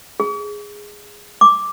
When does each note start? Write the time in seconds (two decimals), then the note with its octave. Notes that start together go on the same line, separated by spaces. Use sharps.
0.20 G#4
1.41 D6